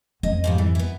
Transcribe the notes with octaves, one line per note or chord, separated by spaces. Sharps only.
F2 D#5
G#2 F3 G3
E3
B3 E4